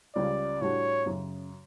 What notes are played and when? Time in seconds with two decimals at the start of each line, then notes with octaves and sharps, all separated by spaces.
0.15 C#2 C#3 G3 D5
0.61 A2 G3 D4 F#4 C#5
1.06 F#2 C#3